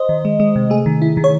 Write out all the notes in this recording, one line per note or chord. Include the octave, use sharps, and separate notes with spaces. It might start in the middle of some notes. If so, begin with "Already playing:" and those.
Already playing: C5 D#5
D#3
G#3
G#3
C3
A3 G#4
D#3
E4
D#3
C#5